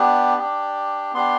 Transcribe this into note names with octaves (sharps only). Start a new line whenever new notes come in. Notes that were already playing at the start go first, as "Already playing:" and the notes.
Already playing: B3 D4 G4
D4 G4
B3 D4 G4 C6